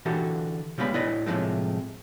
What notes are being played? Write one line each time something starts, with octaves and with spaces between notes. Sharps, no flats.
D3 E3 F#4 G4 A4
C#3 G3 G#3 B3 D5 B5
A2 E4 B4 D5 D#5
A2 C3 F3 G#3 A3